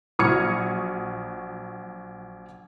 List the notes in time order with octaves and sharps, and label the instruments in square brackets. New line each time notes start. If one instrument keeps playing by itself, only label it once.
[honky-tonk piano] A#1 F#3 D#6 F6 G#6 C#7